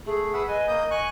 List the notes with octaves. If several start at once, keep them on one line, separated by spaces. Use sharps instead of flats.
A3 G#4
B4 E5 F#5
B4 D#5 G#5
A#3 D#6 G6
G#5 C#6 F#6